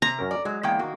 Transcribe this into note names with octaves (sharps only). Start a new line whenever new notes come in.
C3 A#5
F#2 C#4 A#4
D5
F#3 G#3
E2 A#3 G5
D#3 A#3 F#4